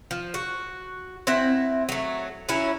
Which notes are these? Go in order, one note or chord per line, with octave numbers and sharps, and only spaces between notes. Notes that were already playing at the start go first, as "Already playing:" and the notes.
F3
F#4
C4 E4 E5 F#5
F#3 A3
F#3 C#4 E4